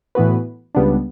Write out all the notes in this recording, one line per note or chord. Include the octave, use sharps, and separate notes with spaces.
A2 E3 B3 F#4 B4
C#2 C#3 G3 B3 D4